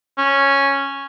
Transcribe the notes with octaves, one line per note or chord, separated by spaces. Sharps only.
C#4